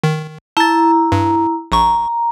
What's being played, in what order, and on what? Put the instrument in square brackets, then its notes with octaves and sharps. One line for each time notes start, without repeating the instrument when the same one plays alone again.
[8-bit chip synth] D#3
[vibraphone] E4 A#5 [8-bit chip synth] A5 A6
[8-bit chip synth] G2
[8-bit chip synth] A#1 C#6 [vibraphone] A#5